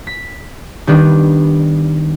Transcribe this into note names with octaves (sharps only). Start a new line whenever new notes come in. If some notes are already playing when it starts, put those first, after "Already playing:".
B6
D#3 G3 B3 D4